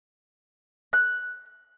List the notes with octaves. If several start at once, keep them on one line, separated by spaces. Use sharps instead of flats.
F#6